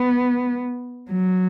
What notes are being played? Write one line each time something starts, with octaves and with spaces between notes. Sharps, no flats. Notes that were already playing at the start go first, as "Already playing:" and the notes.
Already playing: B3
F#3